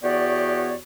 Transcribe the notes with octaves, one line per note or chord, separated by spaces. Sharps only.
E2 B3 F#4 G4 C#5 D5